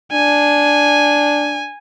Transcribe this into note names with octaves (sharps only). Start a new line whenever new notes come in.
D4 G#5